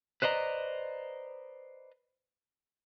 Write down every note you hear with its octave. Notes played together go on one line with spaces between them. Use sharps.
B4 C5 D5 D#5 A#5